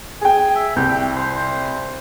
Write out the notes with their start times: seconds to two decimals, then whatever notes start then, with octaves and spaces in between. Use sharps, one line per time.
0.21 G#4 G5 G#5
0.56 E5
0.76 C2 G5
1.16 C5